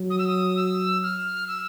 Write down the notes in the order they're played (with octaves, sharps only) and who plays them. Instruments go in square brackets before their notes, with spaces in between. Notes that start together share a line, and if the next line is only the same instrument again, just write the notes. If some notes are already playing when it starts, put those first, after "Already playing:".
Already playing: [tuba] F#3
[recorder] D#6
E6
D#6
E6
F6
E6